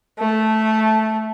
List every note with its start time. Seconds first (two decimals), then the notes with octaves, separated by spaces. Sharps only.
0.19 A3